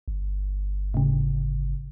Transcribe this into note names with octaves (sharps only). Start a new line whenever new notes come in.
G1
A2 C#3